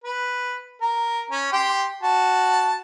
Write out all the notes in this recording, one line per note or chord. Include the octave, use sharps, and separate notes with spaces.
B4
A#4
C#4
G4 G5 C6
F#4 A5